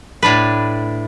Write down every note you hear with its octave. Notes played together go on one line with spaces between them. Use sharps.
A2 D4 B4